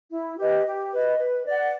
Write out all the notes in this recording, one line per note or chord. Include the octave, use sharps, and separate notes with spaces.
E4
G4 B4 D#5
G4
B4 D#5
B4
D5 F#5